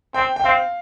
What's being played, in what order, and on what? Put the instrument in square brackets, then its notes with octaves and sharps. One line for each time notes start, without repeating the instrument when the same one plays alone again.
[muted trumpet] C4 [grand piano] G5
[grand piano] G5
[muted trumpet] C4 [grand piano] F5